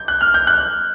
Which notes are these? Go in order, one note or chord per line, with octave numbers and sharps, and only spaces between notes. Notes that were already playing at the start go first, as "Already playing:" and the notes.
Already playing: G6
F#6
F6
G6
F#6